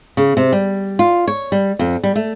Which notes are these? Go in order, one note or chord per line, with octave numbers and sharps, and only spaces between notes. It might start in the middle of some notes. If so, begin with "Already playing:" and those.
C#3
C3
G3
F4
C#5
G3
F2
G3
A3